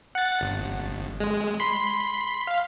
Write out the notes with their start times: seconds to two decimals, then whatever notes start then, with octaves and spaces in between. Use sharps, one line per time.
0.15 F#5 A6
0.41 G1
1.20 G#3
1.60 B5 C6
2.47 F5